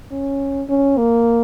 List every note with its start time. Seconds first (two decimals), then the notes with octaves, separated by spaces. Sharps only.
0.11 C#4
0.69 C#4
0.98 A#3